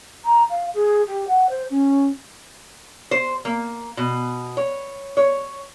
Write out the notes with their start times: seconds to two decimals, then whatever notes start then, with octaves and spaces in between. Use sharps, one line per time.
0.25 A#5
0.50 F5
0.74 G#4
1.07 G4
1.28 F#5
1.49 C5
1.70 C#4
3.11 C5
3.45 A#3
3.97 B2
4.57 C#5
5.17 C#5